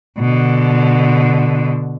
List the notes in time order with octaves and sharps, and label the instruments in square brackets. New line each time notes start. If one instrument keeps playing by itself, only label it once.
[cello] B2 D3